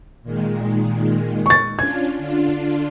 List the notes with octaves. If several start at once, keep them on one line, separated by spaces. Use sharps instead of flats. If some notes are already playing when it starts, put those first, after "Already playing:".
A#2 D#3 G#3
C#6 A6
C#4 D4 F4 G#6
D3 D4 F4